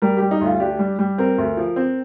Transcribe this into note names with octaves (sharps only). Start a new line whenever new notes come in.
G3 A#4
G3 G4
D#4
D2 F4
D4 G4
G3
G3
C4 A#4
D2
F3
C4